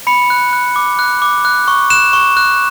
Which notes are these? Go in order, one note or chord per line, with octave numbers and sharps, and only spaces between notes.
B5 C#7
F#6
F#6
D6
F#6
D6
F#6
C#6
F#6 E7
C#6
F#6